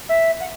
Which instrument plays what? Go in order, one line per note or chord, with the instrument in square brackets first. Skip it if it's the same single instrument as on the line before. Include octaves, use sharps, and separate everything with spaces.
[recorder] E5
F#5